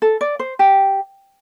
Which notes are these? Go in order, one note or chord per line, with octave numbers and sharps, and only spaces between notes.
A4
D5
C5
G4